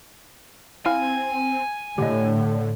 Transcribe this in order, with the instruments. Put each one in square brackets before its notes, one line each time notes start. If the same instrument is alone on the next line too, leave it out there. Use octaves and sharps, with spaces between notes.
[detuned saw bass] C4 [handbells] E4 F5 F6 [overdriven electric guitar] G#5
[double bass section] A2 [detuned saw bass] D3 [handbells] G4 D#5